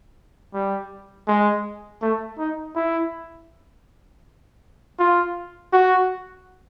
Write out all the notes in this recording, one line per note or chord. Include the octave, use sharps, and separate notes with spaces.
G3
G#3
A3
D#4
E4
F4
F#4